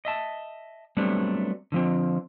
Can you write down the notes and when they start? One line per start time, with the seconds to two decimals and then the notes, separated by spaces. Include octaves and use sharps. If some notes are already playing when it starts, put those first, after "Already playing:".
0.05 D#5 E5 A5
0.97 F#3 G3 A3 B3 C4 D4
1.72 D3 F3 C4